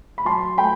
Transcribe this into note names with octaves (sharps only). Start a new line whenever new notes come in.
B5
F#3 A5 C6
A3 G5 B5